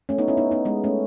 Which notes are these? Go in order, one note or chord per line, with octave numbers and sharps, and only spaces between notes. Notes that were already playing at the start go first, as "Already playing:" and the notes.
A3 C#4
B3 D#4
C#4 E4
B3 D#4
B3 D#4
G#3 B3
A3 C#4